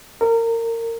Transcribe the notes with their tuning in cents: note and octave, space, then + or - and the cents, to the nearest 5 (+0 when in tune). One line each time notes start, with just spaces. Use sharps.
A#4 -25